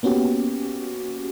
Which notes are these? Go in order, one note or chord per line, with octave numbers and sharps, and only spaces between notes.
A#3 B3 C#4 F#4 G4